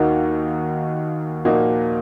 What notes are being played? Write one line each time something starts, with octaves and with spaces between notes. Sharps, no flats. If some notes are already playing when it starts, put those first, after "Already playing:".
Already playing: D#2 D#3 A#3 D#4 F#4
A#2 F3 A#3 D#4 F#4